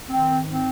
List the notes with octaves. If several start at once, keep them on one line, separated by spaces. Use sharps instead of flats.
D#3 C4
G#2
C4